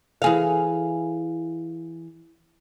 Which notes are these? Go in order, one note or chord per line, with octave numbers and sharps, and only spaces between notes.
E3 G#4 F5